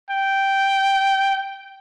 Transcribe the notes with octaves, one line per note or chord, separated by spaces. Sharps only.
G5